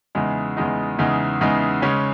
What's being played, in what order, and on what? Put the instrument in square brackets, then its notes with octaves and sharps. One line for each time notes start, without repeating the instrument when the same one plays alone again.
[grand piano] E2 C#3 G#3 D#4
E2 C#3 G#3 D#4
E2 C#3 G#3 D#4
E2 C#3 G#3 D#4
C#3 G#3 C#4